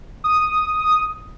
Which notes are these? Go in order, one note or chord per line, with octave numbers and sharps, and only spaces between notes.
D#6